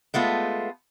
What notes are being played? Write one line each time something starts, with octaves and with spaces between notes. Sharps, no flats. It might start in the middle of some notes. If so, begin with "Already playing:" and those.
G#3 A3 B3 F4